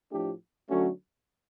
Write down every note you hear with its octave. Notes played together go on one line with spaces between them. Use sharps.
A2 F3 A3 D4 G4
D3 F#3 A3 C#4 F#4